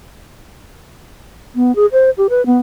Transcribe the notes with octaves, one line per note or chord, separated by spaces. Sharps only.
B3
G#4
C5
G4
B4
B3